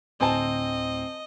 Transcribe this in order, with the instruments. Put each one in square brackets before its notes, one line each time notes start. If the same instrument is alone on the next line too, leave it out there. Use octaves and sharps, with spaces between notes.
[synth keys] D2 A2 [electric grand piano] C4 [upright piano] C5 G#5 A5 [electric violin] D#5